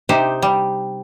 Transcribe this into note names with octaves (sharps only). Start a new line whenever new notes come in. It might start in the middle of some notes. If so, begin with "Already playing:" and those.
C3 D#4 G4 C5
G3